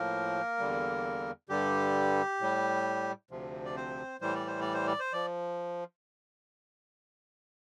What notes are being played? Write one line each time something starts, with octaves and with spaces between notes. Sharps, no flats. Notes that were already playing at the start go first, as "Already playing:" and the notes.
Already playing: A2 F3 A#3 A#4
E2 D3 G3
G2 D3 G3 G4
A2 G3
D2 C3 F3
D5
C4 C5
A2 E3 G3 C5
D5
C5
D5
C5
D5
C5
F3 D5